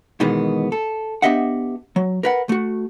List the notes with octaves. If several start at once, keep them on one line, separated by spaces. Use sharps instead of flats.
G#2 B2 D#3 E3 G#3 B3
A4
B3 D4 G4 D#5 E5 F#5
F#3
A#4 B4 F#5
A3 F#4